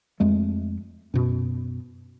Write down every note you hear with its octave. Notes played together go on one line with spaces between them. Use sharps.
F2 G#3 A3
F#2 B2